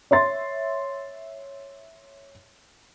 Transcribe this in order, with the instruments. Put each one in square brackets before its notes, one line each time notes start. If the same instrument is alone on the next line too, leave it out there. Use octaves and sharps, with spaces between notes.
[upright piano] C#5 E5 C6 A6